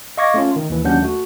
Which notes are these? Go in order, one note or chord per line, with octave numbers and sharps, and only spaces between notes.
D#5 F5 C#6 D6 G#6 A#6
A3 C#4 F4 C#5
D#3
D#2 E3
D#2 F#3 C#4 D4 F#5 G6
A3 F#4